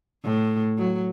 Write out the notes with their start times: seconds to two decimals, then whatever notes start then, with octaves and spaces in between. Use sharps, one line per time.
0.25 A2
0.78 F#3